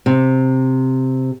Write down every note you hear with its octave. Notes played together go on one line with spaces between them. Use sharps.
C3